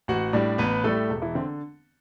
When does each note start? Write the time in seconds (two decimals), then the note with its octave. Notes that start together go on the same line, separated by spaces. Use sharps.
0.08 A1 F#4 F#5
0.33 A2 G3 D4 D5
0.58 A1 B3 B4
0.83 A2 G3 A3 A4
1.10 E1
1.22 E3 E4
1.35 D3 C4